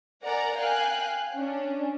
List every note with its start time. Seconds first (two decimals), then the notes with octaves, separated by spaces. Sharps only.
0.24 A#4 D5 F#5 G#5 A#5
0.59 F5 G5 G#5 F#6
1.35 C#4 D4